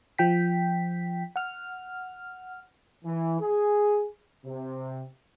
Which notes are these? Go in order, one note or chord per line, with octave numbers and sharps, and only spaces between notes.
F3 G5 B6
F#5 F6
E3
G#4
C3